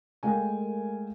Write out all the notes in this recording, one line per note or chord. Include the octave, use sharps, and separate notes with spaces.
G#3 A3 A#4 F5 G5 G#5